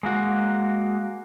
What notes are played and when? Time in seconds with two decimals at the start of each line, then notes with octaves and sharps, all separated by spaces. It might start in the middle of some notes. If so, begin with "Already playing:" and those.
0.03 G#3 A#3 F#4